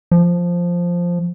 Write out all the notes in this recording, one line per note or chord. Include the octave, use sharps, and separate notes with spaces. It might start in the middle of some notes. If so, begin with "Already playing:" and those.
F3